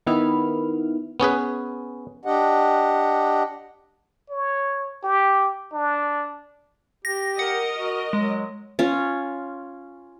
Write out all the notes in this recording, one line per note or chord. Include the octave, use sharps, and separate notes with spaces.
D#3 B3 E4 F6
B3 C#4 G#4 B4
D4 G4 D#5 F#5
C#5
G4
D4
G4 A#6
A#4 D#5 F#5
F#4
F#3 G#3
C#4 F4